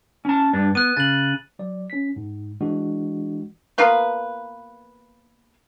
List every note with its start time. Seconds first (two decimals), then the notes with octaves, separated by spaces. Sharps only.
0.25 C#4 A5
0.53 G2 D4
0.75 B3 F#6 D#7
0.97 C#3 A6 F#7
1.59 F#3 D5
1.90 C#4 B6
2.16 G#2
2.61 E3 G#3 D4 F#4
3.78 A#3 B3 F4 B4